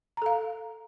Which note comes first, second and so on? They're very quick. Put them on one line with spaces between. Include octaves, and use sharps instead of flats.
A#5 A4 F5